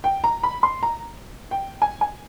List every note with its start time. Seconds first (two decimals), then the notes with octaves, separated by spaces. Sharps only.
0.04 G5
0.24 A#5
0.43 B5
0.63 C6
0.83 A#5
1.51 G5
1.82 G#5
2.01 G#5